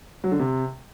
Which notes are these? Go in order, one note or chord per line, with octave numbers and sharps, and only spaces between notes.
F#3
D3
C3